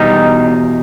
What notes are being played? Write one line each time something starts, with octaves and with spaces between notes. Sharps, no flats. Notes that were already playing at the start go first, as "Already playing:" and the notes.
Already playing: E2 B2 G3 D#4